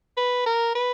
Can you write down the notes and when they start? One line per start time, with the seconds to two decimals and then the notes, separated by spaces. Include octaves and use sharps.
0.17 B4
0.46 A#4
0.75 B4